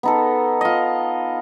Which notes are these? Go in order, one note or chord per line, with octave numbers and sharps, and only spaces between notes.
B3 D#4 A4
F4 D#5